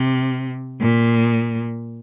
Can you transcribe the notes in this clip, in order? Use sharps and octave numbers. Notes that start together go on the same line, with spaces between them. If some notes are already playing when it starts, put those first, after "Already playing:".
Already playing: C3
A#2